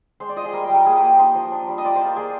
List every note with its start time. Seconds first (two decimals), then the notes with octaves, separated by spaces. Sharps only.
0.20 G#3 C5
0.29 D5
0.36 F4 D#5
0.45 G#4
0.53 G3 A#4
0.64 G5
0.69 G3
0.75 A#4
0.86 A#3 G#4
0.97 A#3 G4
1.19 D#4 C5
1.35 F3
1.51 D4
1.68 G3
1.78 D#5
1.85 F4 D5
1.95 C5
2.01 F4
2.06 A#4
2.16 A#3 G#4